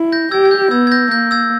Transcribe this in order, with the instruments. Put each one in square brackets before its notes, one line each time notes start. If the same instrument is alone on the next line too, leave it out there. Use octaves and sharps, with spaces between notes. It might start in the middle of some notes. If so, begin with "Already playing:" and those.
Already playing: [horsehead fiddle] E4
[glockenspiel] G6 A#6
[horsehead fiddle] G4 [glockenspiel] E6 G#6
[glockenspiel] G#6
G6
[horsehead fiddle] B3 [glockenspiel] E6 G#6
[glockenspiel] G#6
G6 A#6
[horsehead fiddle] A#3 [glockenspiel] G6 A#6
[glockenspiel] E6 G#6